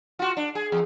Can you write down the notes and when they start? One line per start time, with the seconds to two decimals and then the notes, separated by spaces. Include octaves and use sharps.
0.19 F4 F#4
0.37 D4
0.55 G#4
0.72 E2